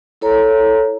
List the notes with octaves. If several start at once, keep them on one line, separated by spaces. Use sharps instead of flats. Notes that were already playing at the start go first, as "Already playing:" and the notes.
E4 A4 C#5 A#5